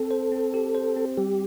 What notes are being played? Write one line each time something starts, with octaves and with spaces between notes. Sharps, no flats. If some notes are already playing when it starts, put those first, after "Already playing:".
Already playing: C4 A4
C5
C4
G4
C5
C4
G3 G4